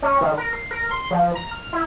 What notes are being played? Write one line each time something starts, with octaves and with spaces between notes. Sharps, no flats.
C#4
D#3
A#4
C7
A#4
C6
F3
A#5
F6
E4